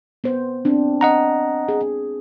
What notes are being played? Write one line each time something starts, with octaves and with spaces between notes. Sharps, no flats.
B3 C5
C4 D4
D#5 F#5 A#5
G#4